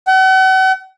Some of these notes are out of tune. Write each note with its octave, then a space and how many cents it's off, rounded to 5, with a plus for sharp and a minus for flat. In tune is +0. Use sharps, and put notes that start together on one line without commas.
F#5 +40